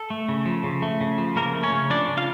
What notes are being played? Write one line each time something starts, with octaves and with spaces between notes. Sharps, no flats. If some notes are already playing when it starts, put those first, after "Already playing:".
Already playing: A4
A3
C#3
F3
C#3
A3
C#3
F3
C#3 A#3 A#4
A3
C#4 C#5
C#3
F3 D4 D5
C#3
F4 F5